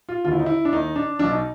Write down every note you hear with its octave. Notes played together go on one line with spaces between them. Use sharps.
F4
D#2 D3 F4
E4
D#4
E4
D4
D#2 D#3 D#4
D4
B1 B2 D4
D#4